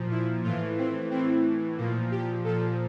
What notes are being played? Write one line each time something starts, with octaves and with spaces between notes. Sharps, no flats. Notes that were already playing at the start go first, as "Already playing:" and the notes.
Already playing: A#2 F3
E4
A2 E3 F4
C4
A2 E3 C4
A#2 F3 A#3
G4
A#2 F3 A4